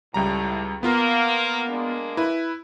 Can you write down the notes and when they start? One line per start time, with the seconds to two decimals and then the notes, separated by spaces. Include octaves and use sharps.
0.14 C#2 A2 G3 A#5
0.83 A#3 B3 F4 A#4
1.69 G#3 A#3 D4
2.17 E4 B4